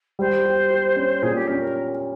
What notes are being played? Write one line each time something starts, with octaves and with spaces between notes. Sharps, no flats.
G3 C5
G4
G4
C#4
A#2 G#4
G4
C#4 A#4
A#4